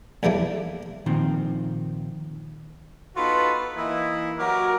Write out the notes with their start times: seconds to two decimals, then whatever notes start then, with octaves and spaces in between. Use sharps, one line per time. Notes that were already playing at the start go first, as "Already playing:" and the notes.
0.23 B1 E2 G3 A3 A#3
1.06 A#2 D#3 F3 C4
3.16 B3 D#4 F4 F#4 A4 B4
3.76 E3 A#3 D#4 E4
4.38 F#3 F#4 G4 A#4